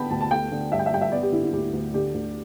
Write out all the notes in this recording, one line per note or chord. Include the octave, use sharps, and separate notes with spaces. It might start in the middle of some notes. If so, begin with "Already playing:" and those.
Already playing: D3 B3 G5 A5 B5
D2 A5
A5
A3 G5
D3
G2 E5
G5
E5
G2 G5
E5
B3 D5
G4
D3 E4
E4
D2 G4
D2
D3 G4
D2